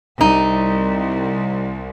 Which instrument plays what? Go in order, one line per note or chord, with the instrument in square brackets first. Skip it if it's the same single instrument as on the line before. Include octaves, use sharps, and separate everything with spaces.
[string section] C2 [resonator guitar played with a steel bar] D#4